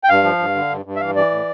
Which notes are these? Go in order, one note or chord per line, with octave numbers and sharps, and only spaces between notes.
G5
G2 F5
F3
G2
D3
G2
G2
E5
E3 F5
E3 D5
A2